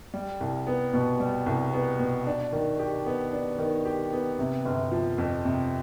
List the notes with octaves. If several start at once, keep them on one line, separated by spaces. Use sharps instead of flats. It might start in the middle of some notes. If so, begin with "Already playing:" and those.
G3
C2
B3
B2
G3
C2
B3
B2
D4
D#3
G4
B3
D4
D#3
G4
B3
C3
G1
F3
F2
C3